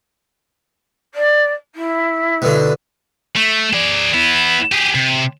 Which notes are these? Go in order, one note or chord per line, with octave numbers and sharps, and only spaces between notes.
D5
E4
B2 D3
A3
G#4 D5
B3 E4
G4 G#4
C3